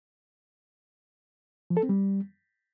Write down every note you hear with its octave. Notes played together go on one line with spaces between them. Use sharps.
F3
A4
C4
G3